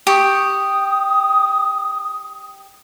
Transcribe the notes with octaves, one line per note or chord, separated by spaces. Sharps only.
G4 C#6 D#6